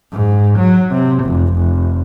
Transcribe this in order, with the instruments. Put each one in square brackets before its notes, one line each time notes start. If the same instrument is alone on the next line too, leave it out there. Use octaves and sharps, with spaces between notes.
[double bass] G#2
F#3
C3
F1
F1